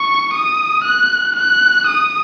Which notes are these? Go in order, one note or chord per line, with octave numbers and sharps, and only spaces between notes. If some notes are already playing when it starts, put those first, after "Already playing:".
Already playing: C#6
D#6
F#6
F#6
D#6